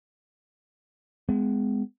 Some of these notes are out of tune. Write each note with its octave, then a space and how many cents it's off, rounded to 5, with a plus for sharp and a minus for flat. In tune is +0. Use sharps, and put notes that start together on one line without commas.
G#3 +0 B3 +40